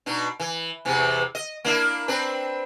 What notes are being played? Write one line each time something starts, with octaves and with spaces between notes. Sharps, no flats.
B2 D4 D#4
E3
E2 C3 E3
D#5
A#3 D4 E4
C4 D4 B4